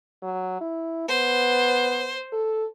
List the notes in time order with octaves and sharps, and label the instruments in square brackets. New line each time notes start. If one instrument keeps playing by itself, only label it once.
[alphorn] F#3
E4
[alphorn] B3 [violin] C5
[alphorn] A4